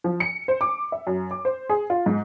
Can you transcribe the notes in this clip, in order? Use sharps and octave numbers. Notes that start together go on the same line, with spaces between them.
F3
C#7
C5
D6
E5
F#2
D6
C5
G#4
F4
G#2